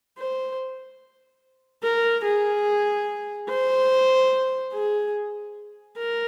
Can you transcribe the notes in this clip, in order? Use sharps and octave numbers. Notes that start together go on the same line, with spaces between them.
C5
A#4
G#4
C5
G#4
A#4